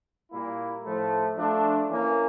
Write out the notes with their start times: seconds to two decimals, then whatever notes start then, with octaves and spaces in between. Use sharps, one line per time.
0.31 A#2 G3 A#3 E4
0.84 A2 F3 A3
1.37 F3 A3 D4
1.90 E3 A#3 C#4